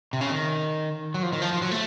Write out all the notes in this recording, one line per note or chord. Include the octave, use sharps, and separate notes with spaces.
C3
C#3
D#3
F#3
F3
D#3
F3
F3
F#3
A3